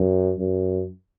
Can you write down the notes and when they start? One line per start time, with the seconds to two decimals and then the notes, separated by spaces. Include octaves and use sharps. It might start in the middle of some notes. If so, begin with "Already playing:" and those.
Already playing: F#2
0.38 F#2